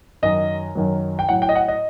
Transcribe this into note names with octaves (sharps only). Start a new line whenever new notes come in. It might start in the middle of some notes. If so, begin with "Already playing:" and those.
F#2 D#3 F#3 D#5
F#2 D#3 F#3
G5
A2 F#3 F#5
G5
D#5
F#5
D#5